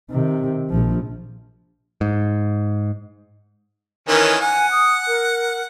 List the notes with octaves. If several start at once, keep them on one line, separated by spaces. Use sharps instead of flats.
C3 D#3
A#1 F3
G#2
D#3 E3 C#4 A#4
F#5 G#5
D#6
A#4